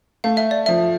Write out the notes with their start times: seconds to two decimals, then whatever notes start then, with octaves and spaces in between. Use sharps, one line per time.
0.24 A3 F5
0.37 E5
0.51 D5
0.66 F3 E5